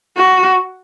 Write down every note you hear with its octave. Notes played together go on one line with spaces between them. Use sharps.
F#4